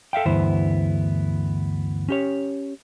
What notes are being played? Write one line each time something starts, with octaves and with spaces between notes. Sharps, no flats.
A4 E5 F5 G5
D2 G2 E3 B3 E4 C5
C#4 G4 C#5